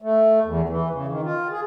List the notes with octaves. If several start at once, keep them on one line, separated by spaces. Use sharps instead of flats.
A3
E2
E3
C#3
D#3
F4
G#4